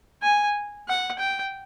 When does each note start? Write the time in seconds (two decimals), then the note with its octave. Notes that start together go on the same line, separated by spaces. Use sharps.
0.23 G#5
0.88 F#5
1.19 G5